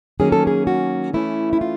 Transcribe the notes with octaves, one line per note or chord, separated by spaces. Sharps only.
D#3 F#3 A#3 C#4 G#4
A4
G#4
F#4
E3 A3 C#4 E4
E4
F4